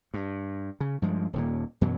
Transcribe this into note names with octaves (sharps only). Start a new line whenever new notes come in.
G2
C#3
G2 F3 G#3
D#1 D#2 A#2
F#2 B2 E3 F#3